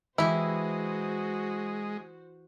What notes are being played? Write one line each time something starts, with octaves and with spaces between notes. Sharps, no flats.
E3 G#3 E4 F#4 G4 C5